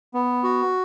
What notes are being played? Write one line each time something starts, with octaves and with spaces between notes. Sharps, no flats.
B3
F#4